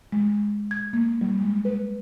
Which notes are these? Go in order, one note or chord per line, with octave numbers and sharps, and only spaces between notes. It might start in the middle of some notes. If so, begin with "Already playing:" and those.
G#3
G#6
A#3
G3
G#3
B4